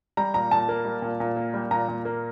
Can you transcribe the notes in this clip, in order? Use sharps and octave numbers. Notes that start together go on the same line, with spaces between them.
G3 A#5
A#2 A#5
A#2 A5
A#3
G3
A#2
A#2
A#3
G3
A#2 A#5
A#2
A#3